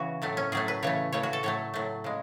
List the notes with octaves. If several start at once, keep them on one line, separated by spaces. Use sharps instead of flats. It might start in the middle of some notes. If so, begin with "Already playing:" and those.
Already playing: C#3 E3 F#4
A2 F#3 A3
C#4
A2 F#3 A3 G#4
B4
C#3 E3 A3 C#5
C#3 E3 A3 C#5
F#4
A4
A2 F#3 A3 C#5
A2 F#3 A3
C#3 G#3